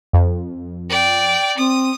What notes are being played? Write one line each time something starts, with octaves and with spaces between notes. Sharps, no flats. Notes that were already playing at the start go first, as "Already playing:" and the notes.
F2
D5 G5
C4 D#6